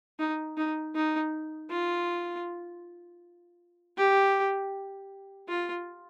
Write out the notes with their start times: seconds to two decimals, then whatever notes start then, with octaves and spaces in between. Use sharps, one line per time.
0.19 D#4
0.57 D#4
0.95 D#4
1.70 F4
3.97 G4
5.49 F4